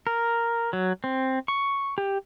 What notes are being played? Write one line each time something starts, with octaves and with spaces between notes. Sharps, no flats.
A#4
F#3
C4
C#6
G4